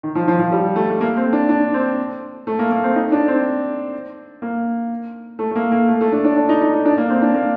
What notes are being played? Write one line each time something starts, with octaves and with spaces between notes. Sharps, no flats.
D#3
F3
F3
F3
G3
A3
A3
A#3
C4
D4
D4
C4
A3
A#3
A#3
C4
D#4
D4
C4
A#3
A3
A3
A#3
A#3
A3
A3
D4
D4
D4
D#4
D#4
D#4
D4
A#3
C4
D4
A#3